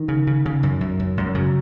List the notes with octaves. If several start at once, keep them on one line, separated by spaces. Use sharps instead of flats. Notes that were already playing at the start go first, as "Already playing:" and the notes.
Already playing: D#3
C#3
C#3
C#3
F#2
F#2
F#2
F#2
C#3 F#3